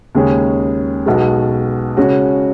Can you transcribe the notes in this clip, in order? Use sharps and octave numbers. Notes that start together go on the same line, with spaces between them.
D#2 C#3 G#3 C#4 G#4
B1 B2 G#3
C#3 G#3 C#4 F#4